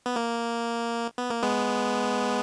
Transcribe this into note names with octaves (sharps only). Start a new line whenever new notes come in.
B3
A#3
B3
A#3
G#3 B3